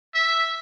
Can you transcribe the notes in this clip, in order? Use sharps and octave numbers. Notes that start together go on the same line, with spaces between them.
E5